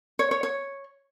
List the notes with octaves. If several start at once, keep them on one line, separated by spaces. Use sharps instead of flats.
C#5
C#5
C#5